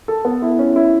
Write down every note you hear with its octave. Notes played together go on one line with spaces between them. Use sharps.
A4
B3
E4
C#4
E4